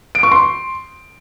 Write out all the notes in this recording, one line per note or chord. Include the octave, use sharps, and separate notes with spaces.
D7
C#6
C6